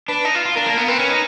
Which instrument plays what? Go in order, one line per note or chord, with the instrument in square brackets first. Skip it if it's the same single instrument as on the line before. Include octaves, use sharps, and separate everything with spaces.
[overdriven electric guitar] D4 [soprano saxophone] B4
[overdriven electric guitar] D#4
F4
F4
[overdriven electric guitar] D4 [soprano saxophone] A#4
[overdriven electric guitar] A#3
B3
[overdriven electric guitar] C4 [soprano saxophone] B4
[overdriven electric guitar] C#4
D#4